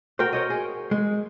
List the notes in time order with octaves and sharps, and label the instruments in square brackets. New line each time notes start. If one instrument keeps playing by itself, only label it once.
[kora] F#4 A#4 G5 [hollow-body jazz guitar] C5
[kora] A#4 C#5 D#5
G#4
[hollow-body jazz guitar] G#3